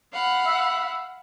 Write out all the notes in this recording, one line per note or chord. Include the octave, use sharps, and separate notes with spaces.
F5 F#5 B5
E5